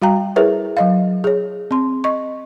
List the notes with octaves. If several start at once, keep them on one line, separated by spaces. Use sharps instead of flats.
G3 F#4 F5 G5 A#5
E4 G#4 A#4 B4 C#5 E5
F#3 D#5 F5
G#4 C#5
C4 C6
D#5 C#6